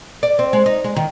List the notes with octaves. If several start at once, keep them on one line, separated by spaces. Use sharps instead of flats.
D5
C4
G#3
D#4
G#3
D#3